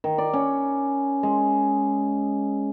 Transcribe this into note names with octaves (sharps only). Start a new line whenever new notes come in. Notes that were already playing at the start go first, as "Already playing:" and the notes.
D#3
D5
C#4
G#3